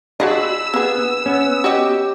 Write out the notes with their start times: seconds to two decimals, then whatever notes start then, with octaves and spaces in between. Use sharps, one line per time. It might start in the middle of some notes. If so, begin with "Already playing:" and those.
0.20 D4 F4 F#4 G#4 D#5 B5 E6
0.74 A#3 B3 G#4
1.26 B3 C#4
1.64 F#4 G4 D#5